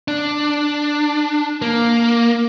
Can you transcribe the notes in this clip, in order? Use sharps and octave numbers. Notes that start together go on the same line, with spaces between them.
D4
A#3